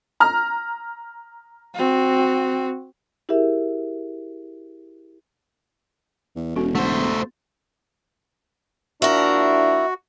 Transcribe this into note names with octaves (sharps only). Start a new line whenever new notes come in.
A#5 F6
C4 F#4
E4 G4 G#4 A#4 E5
E2
E1 C#4 F#4 A4
A3 B3 C5
F3 A#3 D4 E4 F#4 A#4